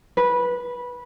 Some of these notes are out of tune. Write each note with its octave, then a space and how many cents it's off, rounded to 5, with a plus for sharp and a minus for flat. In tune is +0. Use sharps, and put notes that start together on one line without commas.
B4 -15